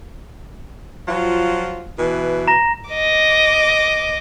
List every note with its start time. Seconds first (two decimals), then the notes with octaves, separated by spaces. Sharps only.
1.08 F3 F#3 F4
1.98 B2 E3
2.48 A#5 A#6
2.89 D#5 D6